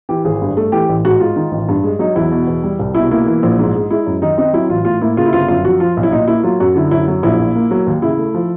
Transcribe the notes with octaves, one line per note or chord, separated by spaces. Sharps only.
E3 G4
G#1 G#4
G2
A3
E3 G4
A1
G#2 F#4
G#3 F4
D#3
A1
G2
G#3
F#3 D#4
E2 E4
B2
E2
G3
C2
B2 E4
A#3 E4
E3
A#1
G#2
G#3
G#3 E4
F#2
D#3 D#4
C4 D#4
F#3 E4
A1 F4
A2 F4
A#3 E4
C#3 F4
E4
G1 F4
F#2 F4
F3 F#4
F3 F4
B1
E4
A#2 D#4
A#3 E4
F#3 F4
F#2 F#4
D3 E4
F#2 E4
F#3
A#1 E4
A#2
A#3
F#3
D#2
C#3 E4
A3
F3